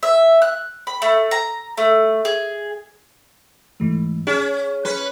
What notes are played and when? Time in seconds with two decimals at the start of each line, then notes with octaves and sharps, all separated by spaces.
0.03 E5
0.42 F#6
0.87 B5
1.02 A3
1.31 A#5
1.77 A3
2.25 G#4
3.80 G#2 E3 A3
4.27 C#4 G#4
4.85 C#4 B4